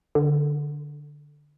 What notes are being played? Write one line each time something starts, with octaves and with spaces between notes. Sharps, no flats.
D3